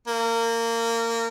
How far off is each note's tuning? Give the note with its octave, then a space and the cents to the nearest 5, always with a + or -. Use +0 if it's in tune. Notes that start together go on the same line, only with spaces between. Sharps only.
A#3 -20